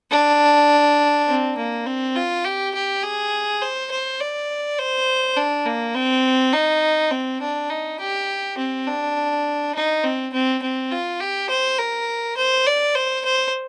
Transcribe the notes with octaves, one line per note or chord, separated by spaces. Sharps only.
D4
C4
A#3
C4
F4
G4
G4
G#4
C5
C5
D5
C5
D4
A#3
C4
D#4
C4
D4
D#4
G4
C4
D4
D#4
C4
C4
C4
F4
G4
C5
A#4
C5
D5
C5
C5